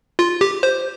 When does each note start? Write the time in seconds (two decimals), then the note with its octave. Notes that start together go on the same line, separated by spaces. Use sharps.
0.19 F4
0.41 G4
0.63 C5